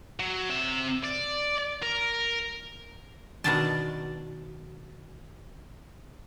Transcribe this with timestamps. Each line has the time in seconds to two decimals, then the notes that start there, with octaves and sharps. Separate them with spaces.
0.19 F#3
0.50 C3 E5
1.03 D5
1.83 A#4
3.44 B2 D#3 D4 D5 D#5 A5